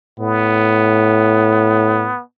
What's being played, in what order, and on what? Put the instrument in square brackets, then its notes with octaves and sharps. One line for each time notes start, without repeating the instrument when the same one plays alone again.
[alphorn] A2 [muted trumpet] B3